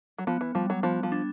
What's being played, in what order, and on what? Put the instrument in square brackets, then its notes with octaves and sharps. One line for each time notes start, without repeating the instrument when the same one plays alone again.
[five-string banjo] F#3
[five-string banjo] F3 [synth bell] B3
[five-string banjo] E3
[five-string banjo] F3 [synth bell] G3
[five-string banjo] F#3
[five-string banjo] F3 [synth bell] B3
[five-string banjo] F3
[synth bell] D4